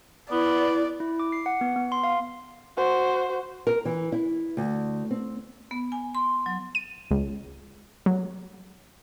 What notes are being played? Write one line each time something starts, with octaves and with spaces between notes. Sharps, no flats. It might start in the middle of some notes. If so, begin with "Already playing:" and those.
B3 E4 D5
E4
D6
C7
F#5
B3
B3
C6
F5
F#4 C5
A#4
E3
E4
D2
C4
B3
G#5
C6
F#3
D#7
C#2
F#3